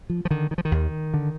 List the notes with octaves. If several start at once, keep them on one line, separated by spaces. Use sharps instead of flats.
F3
F3
D3 D#3
D#3
F3
D#3
D#2
D3